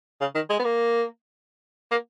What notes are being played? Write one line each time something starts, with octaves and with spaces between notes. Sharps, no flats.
C#3
D#3
G#3
B3
A#3
A#3